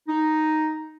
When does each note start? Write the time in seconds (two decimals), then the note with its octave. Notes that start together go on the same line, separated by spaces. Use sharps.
0.08 D#4